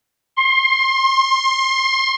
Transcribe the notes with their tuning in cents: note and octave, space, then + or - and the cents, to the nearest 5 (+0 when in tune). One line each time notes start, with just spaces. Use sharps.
C6 +25